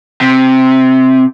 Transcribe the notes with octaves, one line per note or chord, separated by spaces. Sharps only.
C3